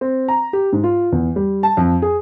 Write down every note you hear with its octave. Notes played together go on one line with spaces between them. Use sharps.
C4
A#5
G4
G#2
F4
E2
G3
A5
F2
G#4